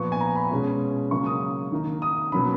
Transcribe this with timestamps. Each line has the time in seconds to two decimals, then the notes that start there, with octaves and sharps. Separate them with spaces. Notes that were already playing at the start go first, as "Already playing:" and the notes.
Already playing: A#2 F3 B3 C#6
0.12 G#5
0.20 A#5
0.35 B5
0.51 B2 G#3 C#4 F4
1.11 C#3 F#3 A#3 C#6
1.26 D#6
1.72 D#3 A#3 D#4
2.02 D#6
2.32 B2 F#3 A#3 C#4 B5